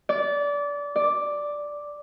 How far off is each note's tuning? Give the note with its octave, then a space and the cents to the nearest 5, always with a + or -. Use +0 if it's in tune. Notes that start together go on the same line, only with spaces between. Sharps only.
D5 -25
D5 +0